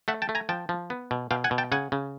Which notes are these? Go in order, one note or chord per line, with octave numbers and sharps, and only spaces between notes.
A3 E5 F#5
G5 A5
A3
G#5 A#5
F3 G5 A5
F3
B3
B2
B2 F5 G5
F#5 G#5
B2
G5 A5
C#3 F#5 G#5
C#3